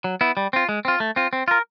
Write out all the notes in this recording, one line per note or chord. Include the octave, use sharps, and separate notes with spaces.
F#3
B3 E4
G3
C4 F4
G#3
C4 F4
A3
C4 F4
C4
F4 A#4